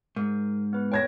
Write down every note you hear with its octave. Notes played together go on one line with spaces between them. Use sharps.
G#2 A#4
B3 B4
C#5 G5 G#6 A#6